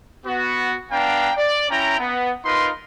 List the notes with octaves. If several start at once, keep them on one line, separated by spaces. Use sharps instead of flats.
B3 F#4
B3 D4 F5 G5 A#5
D5
C#4 E4 G5 A#5
B3
D#4 F4 A#4 B4 C6